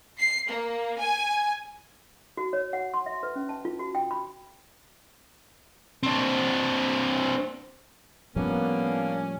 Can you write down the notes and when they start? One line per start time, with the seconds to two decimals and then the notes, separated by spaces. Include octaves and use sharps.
0.19 C7
0.48 A#3
0.98 G#5
2.37 F#4
2.53 C#5
2.73 F#5
2.94 C6
3.06 E5
3.23 B4
3.36 C#4
3.49 A5
3.65 F4
3.79 F#4
3.95 G5
4.11 B5
6.03 C4 D4
8.36 A2 F3 G3 A#3 B3 C#4 D4